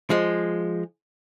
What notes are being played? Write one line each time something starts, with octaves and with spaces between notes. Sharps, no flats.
F3 G#3